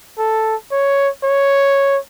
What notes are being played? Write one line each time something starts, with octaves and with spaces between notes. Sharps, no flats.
A4
C#5
C#5